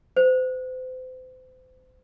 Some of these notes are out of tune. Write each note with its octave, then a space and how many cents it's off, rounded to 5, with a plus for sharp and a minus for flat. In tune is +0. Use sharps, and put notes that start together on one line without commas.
C5 -35